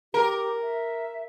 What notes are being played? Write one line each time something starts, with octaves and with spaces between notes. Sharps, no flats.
G4 A#4
E5